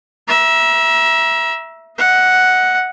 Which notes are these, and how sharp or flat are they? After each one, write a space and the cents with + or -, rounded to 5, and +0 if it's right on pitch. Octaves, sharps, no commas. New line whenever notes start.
E5 +0 A#5 +35
D#5 +25 F#5 +0